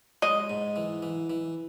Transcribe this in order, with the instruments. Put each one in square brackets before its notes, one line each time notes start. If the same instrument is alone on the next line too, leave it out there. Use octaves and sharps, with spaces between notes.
[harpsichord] G#3 [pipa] D#5
[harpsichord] G#2
E3
E3
E3